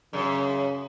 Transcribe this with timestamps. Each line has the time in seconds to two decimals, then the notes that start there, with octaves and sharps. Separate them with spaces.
0.13 F#2 C#3